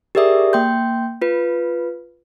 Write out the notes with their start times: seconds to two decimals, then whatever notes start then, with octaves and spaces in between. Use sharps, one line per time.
0.15 G4 G#4 A#4 D5 E5 D#6
0.53 A#3 G5 C6 G6
1.22 F4 B4